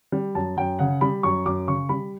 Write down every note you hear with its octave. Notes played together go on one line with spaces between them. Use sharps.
G3
F#2 A5
F#2 G5
C#3 F#5
G3 B5
F#2 C#6
F#2 D6
C#3 C#6
G3 B5